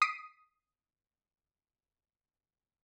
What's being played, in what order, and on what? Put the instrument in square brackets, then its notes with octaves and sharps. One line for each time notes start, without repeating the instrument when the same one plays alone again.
[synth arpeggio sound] D#6 B6 C7 D7 D#7